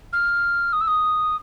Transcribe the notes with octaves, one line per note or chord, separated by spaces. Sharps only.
F6
D#6
E6
D#6